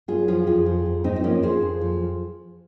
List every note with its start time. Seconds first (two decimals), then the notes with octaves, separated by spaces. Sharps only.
0.08 F#2 F4 G#4
0.28 F3 F4 G#4
0.47 F2 F4 G#4
0.66 F3
0.86 F2
1.04 G#2 C4 D#4
1.16 D#4
1.24 F3 A#3 C#4
1.42 F3 G#4 C5
1.62 F2
1.81 F3